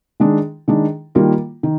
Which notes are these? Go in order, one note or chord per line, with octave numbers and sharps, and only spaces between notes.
D#3 G#3 D4
D#3 G#3 D4
D#3 G3 A#3 F4 A#4
D#3